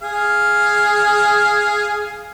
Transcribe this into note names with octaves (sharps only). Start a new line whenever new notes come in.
G#4 F5